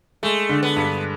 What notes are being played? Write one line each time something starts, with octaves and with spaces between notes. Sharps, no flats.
G#3 A3
D3
B3
G2